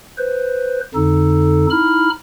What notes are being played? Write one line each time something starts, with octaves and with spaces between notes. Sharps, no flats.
B4 C5
F2 D3 D#4 A4
D#4 E4 B5 F6